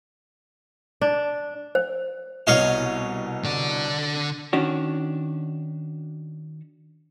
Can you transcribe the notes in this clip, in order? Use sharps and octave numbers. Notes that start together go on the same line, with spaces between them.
D4
C5
C2 B2 C#5 D#5 F5
D3 D5
D#3 C#4 D4 F#4